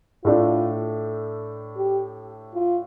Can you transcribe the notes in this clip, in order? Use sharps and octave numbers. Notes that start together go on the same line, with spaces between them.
A2 A3 D4 F4
G4
F4